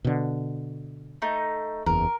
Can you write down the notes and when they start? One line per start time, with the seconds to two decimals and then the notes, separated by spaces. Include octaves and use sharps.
0.05 B2 D3
1.22 A3 D#4
1.86 F#1 E2 A#4